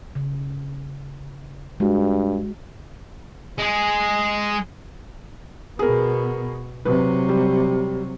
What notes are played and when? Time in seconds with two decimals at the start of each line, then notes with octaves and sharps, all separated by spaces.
0.15 C#3
1.80 G2 G#3 F#4
3.58 G#3 G#4
5.79 B2 B3 G#4 A#4
6.85 C3 F#3 B4
7.29 G3